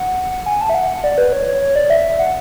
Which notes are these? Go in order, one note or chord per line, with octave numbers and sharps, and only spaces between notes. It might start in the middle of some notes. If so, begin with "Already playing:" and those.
Already playing: F#5
G#5
A5
E5
F#5
D5
B4
C#5
C#5
C#5
D5
E5
F#5